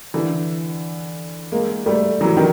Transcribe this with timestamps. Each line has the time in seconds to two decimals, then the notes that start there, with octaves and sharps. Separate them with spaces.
0.14 D3 E3
1.52 G#3 A#3
1.86 G3 A3
2.21 E3 F#3
2.37 D#3